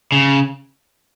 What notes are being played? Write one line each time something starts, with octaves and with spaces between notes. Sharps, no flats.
C#3